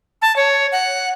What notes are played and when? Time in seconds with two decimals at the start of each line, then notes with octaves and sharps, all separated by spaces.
0.22 A5
0.36 C#5
0.72 F#5